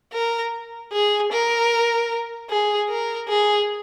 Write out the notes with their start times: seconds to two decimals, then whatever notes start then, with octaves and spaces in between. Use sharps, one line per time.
0.13 A#4
0.93 G#4
1.32 A#4
2.50 G#4
2.89 A#4
3.29 G#4